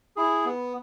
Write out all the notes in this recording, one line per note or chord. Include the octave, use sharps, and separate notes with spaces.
E4 G#4
B3